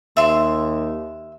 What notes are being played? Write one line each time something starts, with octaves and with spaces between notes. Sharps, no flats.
D#2 E5 C6